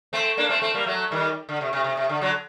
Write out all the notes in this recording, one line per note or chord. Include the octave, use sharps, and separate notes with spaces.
A3 C4
A#3 D4
A3 C4
A3 C4
G3 A#3
F#3 A3
D#3 G3
D3
C3
C3
C3
C3
D3
D3 F#3